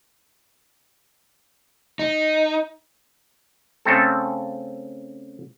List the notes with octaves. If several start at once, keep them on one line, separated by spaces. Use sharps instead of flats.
D#4
C#3 A3 C4 A4